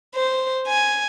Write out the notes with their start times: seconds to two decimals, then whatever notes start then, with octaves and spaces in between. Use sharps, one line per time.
0.15 C5
0.67 G#5